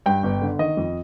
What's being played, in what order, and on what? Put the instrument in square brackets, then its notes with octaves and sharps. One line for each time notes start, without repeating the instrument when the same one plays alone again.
[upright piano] G2 G5
G1
D3
D#3 D#5
F2